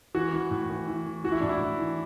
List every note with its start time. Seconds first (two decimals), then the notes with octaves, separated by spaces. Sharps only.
0.15 E3 F#4
0.33 E3
0.51 A2
0.70 E3
0.88 E3
1.06 E3
1.24 E3 F#4
1.32 E4
1.41 A2 D4
1.49 E4
1.61 A2
1.79 E3